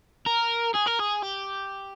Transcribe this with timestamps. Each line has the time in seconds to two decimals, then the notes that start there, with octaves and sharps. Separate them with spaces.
0.26 A#4
0.75 G#4
0.87 A#4
1.00 G#4
1.23 G4